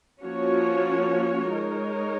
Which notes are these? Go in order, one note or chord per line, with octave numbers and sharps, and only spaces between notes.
F3 A#3 C#4 F#4 C#5
G#3 D#4 A#4 C#5